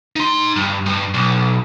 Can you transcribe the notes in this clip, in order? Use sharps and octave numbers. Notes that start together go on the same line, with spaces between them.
D#4 C6
G2
G2
B1